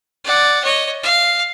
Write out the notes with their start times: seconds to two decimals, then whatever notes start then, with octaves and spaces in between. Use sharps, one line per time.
0.25 D5 F#5
0.64 C#5 D#5
1.03 F5